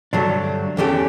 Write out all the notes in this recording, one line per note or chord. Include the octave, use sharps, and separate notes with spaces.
G2 D3 F#3 A3 D4
E2 D3 A3 C#4 G4